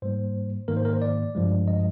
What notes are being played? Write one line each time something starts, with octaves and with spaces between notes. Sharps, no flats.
G#2 G3 A#3 C5
G#2 D#3 A#3 A#4
C5
A#4
C5
D5
G2 F3 G#3
D#5